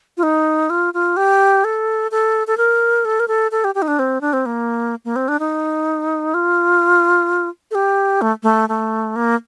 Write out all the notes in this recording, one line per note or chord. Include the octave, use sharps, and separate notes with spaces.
F4
D#4
F4
F4
G4
A4
A4
A4
A#4
A4
A#4
A4
A4
G4
G4
D#4
D4
C4
D4
C4
A#3
A#3
C4
D4
D#4
F4
A4
G4
A3
A3
A3
A#3